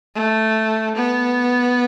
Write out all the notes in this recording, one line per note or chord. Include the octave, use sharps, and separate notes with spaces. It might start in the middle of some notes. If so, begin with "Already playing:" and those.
A3
B3